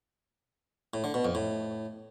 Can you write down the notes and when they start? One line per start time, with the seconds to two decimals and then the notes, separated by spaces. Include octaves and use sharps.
0.94 A2
1.04 D3
1.14 B2
1.25 F2
1.35 A2